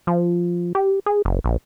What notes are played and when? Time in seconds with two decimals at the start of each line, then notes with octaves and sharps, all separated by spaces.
0.07 F3
0.75 G4
1.06 G#4
1.25 F#1
1.44 A#1